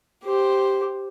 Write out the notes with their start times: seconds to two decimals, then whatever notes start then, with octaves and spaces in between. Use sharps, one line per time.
0.24 G4 C5